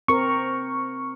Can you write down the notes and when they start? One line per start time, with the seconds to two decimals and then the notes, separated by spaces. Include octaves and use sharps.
0.08 C4 A#4 C#6